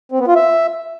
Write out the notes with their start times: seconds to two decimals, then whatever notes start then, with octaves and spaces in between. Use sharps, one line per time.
0.12 C4
0.20 B3
0.28 F4
0.36 E5